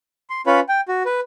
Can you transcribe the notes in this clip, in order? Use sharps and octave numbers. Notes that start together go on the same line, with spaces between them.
C6
C#4 F4 B4 C#5 B5
G5
F#4
B4